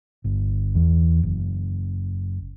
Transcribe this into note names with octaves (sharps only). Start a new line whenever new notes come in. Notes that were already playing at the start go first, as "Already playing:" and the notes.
G1
E2
F#1